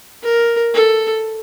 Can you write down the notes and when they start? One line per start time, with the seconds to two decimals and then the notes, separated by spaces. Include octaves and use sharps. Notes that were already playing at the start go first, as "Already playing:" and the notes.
0.23 A#4
0.74 A4